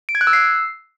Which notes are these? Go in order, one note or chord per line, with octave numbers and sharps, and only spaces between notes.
D7
G#6
F#6
E6
C7